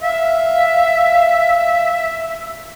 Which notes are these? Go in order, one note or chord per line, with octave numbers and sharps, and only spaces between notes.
E5 F5